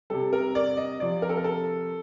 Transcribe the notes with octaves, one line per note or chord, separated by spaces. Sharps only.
C3 G3 A4
A#4
D5
D#5
C3 F3 D5
A#4
A4
A#4
A4